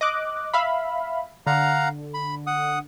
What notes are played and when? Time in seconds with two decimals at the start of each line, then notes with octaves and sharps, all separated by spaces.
0.01 D#5 D6 F#6
0.54 E5 F5 B5
1.46 D3 F5 F#5 A#5
2.14 B5
2.47 F#5 D#6